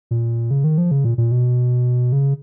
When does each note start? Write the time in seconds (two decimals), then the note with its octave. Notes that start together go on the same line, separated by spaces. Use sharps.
0.11 A#2
0.51 C#3
0.64 D#3
0.78 F3
0.91 C#3
1.04 A#2
1.18 A#2
1.32 B2
2.12 C#3